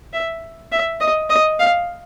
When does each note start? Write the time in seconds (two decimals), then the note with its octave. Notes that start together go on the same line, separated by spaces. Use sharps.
0.13 E5
0.72 E5
1.01 D#5
1.30 D#5
1.59 F5